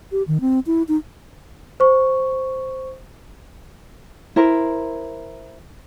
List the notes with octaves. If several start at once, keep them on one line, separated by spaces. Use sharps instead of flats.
G4
D#3
C4
E4
D#4
C5 C#6
E4 A#4 C5